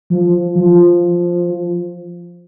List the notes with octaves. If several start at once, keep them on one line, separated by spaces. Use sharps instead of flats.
F3
F3